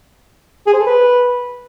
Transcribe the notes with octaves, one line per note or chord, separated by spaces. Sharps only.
G#4
C5
A4
B4